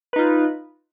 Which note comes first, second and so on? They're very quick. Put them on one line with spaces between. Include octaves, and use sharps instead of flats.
B4 D#4 F4